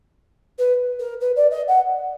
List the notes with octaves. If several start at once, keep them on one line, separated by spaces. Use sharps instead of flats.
B4
A#4
B4
D5
D#5
F#5